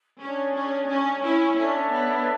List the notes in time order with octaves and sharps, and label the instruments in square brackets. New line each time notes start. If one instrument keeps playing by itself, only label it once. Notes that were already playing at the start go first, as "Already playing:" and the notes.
[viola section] C#4 [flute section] D4 G#4 C#5
[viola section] C#4
C#4
C#4 E4
[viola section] C#4 [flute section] D4 A4 C#5 E5
[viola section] B3